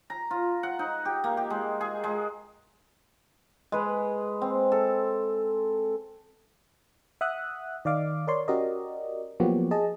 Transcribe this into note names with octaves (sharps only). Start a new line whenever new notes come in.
A#5
F4
F#5
D#4
G4
A#3
G4
G#3
G#4
G#3
G#3 B4
C4
A4
E5 F#5 D#6 F#6
D#3 D5 D#5 F5 D6
A#4 C#5 D5 C6
C#4 F#4 G4 A#4 D5 D#5
F3 F#3 A#3 B3 F#4 G4
G#4 D#5 A5